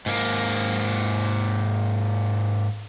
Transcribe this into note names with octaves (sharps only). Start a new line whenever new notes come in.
G#2 A#3